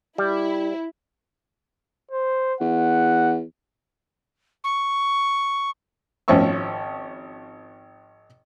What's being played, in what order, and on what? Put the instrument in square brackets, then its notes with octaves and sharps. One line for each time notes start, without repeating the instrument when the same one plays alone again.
[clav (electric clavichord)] G3 [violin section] E4
[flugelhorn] C5
[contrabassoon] E2 [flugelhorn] F#5
[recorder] C#6
[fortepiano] G#1 F3 C#4 E5 C#6 E6